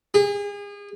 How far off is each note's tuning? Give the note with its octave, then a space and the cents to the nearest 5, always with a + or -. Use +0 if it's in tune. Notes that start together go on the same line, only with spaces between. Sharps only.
G#4 -35